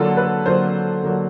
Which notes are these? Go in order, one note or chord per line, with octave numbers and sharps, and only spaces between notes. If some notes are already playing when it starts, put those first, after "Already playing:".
Already playing: D3 F#3 A#3 D4 F4 A4
B4
D3 F#3 A#3 D4 F4 C5
D3 F#3 A#3 D4 F4